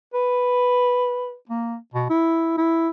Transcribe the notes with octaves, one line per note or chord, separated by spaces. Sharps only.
B4
A#3
B2
E4
E4